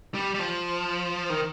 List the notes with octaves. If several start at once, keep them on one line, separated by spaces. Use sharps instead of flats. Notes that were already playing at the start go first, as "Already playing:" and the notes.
G3
G3
F3
D#3